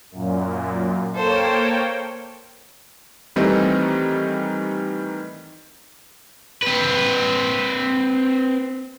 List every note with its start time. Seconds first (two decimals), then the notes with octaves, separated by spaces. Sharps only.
0.11 F#2 A#2
1.15 A#3 A4 C5 C#5 G5
3.36 D#3 E3 G3 A3 C4 D#4
6.63 C4 B4